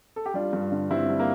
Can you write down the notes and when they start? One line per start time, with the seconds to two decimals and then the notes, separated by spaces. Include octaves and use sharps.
0.16 A4
0.26 G4
0.34 G3 D4 F4
0.53 G2
0.72 D3
0.91 G2 C4 E4
1.10 G3
1.20 A#3